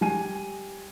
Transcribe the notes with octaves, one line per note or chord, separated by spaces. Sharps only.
G3 G#5 D#7